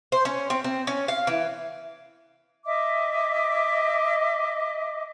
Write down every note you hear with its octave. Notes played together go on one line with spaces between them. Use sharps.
C5
C#4
C4
C4
C#4
F5
E3
D#5 E5 D6